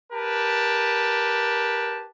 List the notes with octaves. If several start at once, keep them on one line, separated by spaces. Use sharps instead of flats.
G4 A#4 B4 A5